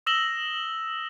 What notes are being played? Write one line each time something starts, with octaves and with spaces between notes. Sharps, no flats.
D#6 E6 A#6 E7 F#7 G7